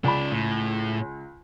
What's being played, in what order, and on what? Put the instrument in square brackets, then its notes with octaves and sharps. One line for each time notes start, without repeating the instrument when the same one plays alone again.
[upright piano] C#2 B5 [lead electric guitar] C#4 D5
[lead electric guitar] A2